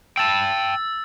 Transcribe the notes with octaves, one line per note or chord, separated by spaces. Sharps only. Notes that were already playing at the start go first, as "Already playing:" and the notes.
G5 A5 E6 A6